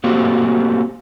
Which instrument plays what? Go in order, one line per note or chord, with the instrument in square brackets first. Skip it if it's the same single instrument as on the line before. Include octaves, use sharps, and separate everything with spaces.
[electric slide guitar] A3 A#3 C4 F#4 G4